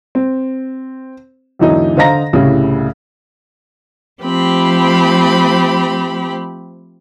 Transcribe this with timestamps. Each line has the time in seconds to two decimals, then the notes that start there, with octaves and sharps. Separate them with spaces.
0.15 C4
1.59 E2 G#2 D3 E3 F#3 D#4
1.97 D3 C5 D#5 F5 A#5 A#6
2.33 C2 A2 C#3 G3
4.22 F3 A3 C4 G4 B5